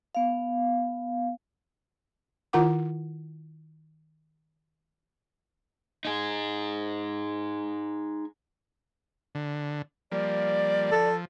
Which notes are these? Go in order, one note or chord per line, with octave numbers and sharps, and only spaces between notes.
B3 F5
D#3 E4 F4 A#4 F#5 D6
D#4 G#4
D3
F3 G3 A#3 D5
F3 A4